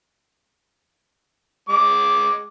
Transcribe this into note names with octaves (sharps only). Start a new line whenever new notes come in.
G#3 D6